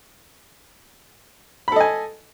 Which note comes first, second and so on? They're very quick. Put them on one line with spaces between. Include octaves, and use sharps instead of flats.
B5 A4 D#5 G#5